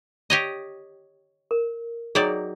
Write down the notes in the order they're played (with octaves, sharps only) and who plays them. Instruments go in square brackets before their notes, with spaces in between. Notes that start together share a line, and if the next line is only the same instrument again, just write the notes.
[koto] G4 C#5 D#5
[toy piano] A#4
[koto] F#3 D#4 D5 [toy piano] G#4 C#5 G5